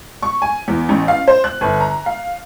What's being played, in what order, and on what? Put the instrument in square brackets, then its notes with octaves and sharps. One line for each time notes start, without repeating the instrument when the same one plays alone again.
[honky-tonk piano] C#6
G#5
E2
A1
F5
C5
F#6
G1
A#5
F5